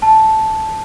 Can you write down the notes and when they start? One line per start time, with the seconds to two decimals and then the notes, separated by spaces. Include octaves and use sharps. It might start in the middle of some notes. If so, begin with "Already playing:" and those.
0.02 A5